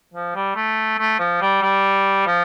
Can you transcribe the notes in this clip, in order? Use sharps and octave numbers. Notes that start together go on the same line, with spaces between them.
F3
G3
A3
A3
F3
G3
G3
F3